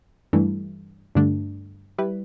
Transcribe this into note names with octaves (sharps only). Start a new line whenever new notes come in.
G2 E3 A3
G2 D3 A3 D4
G3 E4 B4